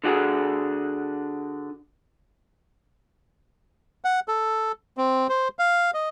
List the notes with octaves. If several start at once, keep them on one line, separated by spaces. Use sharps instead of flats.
D3 D4 F#4 G#4
F#5
A4
C4
C5
F5
D#5